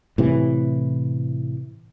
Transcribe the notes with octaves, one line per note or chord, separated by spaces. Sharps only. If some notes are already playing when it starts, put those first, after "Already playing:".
A2 C3 E3